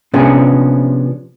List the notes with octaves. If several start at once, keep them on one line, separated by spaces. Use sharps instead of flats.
C3 F3 B3 C#4 D4 G#4